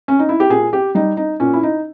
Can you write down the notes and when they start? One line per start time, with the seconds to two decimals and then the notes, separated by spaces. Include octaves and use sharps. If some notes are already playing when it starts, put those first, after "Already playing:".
0.08 C#4
0.19 D#4
0.29 E4
0.40 G4
0.50 A#2 G#4
0.73 G4
0.95 G3 D#4
1.17 D#4
1.40 A#2 C#4
1.53 E4
1.63 D#4